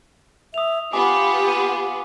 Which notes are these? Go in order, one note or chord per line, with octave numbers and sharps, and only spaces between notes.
E5 D#6 F7
B3 F4 G4 G#5 D6
D#7